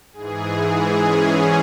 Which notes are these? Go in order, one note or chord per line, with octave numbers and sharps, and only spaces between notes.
G#2 E3 G#4
G#4
C#4